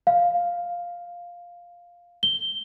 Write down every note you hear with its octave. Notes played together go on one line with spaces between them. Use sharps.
F5
G7